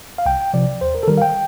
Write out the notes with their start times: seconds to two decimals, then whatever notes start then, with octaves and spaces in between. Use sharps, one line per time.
0.18 F5
0.26 C2 G5
0.54 C3 F3 D5
0.81 D#2 C5
0.95 A#4
1.03 A4
1.08 D#3 G3 A#4
1.18 F5
1.22 G5